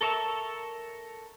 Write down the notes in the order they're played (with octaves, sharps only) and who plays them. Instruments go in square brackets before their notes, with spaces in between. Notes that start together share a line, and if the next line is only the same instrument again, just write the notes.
[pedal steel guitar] A4 A#4 C#5 E5 A5